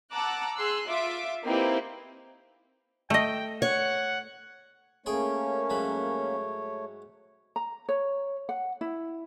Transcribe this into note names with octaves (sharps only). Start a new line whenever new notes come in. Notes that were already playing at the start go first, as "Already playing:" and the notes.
F#5 A5 A#5 D6 E6 F#6
G#4 C6 E6 F#6
F4 E5 D6
A#3 C4 D#4 E4 G4 B4
A3 D#5 G5
C#5 F#5
A3 A#3 C#4 G#4 C#5 G5 C6
G#2 F#3 B5
A#5
C#5
F#5
E4